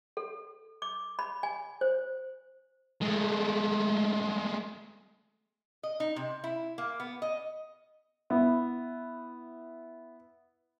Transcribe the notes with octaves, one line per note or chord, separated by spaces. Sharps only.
A4
D6
B5
G#5
C5
G#3 A3
D#5
D#4
C3
E4
A#3
B3
D#5
B3 E4